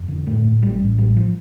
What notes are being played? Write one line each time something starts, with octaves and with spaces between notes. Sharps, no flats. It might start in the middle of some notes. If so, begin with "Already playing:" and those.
Already playing: F1
D3
A2 A3
A2
A1 G3
A2
A1 G3
F3